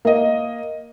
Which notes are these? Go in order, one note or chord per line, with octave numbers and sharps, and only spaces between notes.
A#3 D#5